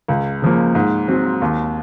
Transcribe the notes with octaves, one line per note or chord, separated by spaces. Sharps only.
C#2
C#3 F3 A#3
G#2
F#3 C4
D#2